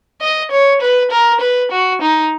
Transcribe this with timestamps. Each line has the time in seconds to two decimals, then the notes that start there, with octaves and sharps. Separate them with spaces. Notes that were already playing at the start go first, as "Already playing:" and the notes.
0.21 D#5
0.52 C#5
0.82 B4
1.11 A#4
1.41 B4
1.71 F#4
2.01 D#4